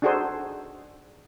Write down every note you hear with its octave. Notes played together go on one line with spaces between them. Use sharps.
D4 D#4 F#4 G#4 A4 C5